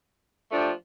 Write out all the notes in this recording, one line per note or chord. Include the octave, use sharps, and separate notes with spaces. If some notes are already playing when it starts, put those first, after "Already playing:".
F3 A3 D4 G4